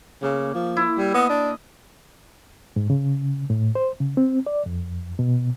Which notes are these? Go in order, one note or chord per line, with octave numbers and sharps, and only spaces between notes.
C#3 A#3
F3
E4
G3
B3 D#5
D4
G#2
C#3
A2
C5
C#3
C4
D5
F2
B2